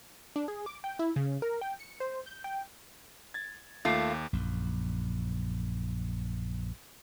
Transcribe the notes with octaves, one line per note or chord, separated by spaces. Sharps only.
D4
G#4
D6
G5
E4
C#3
A#4
G5
C#7
C5
G6
G5
G#6 A6
D#2 A3 F4 D6
A#1 F#2